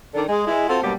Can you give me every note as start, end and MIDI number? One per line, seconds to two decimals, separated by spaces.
0.15 0.23 51
0.15 0.23 62
0.15 0.23 69
0.28 0.46 56
0.47 0.65 56
0.47 0.65 64
0.69 0.81 60
0.69 0.81 65
0.69 0.81 66
0.69 0.81 69
0.82 0.93 43
0.82 0.93 47
0.82 0.93 54
0.82 0.93 55
0.82 0.93 58
0.82 0.93 67